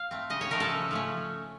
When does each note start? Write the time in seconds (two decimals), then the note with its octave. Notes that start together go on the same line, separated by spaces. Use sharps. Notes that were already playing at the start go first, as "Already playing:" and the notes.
Already playing: F5
0.11 A3 C4
0.30 C#3 D#5
0.41 C#5
0.50 F3 A3 C#4 A#4
0.60 A4
0.70 C#3
0.91 F3 A3 C#4